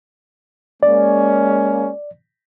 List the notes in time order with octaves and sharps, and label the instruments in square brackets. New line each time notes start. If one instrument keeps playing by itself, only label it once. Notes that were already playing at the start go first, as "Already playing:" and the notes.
[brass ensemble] G#3 A#3 C#4 [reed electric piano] D5